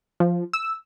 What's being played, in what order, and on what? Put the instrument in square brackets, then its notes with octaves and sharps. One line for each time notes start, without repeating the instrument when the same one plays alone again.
[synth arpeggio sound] F3
E6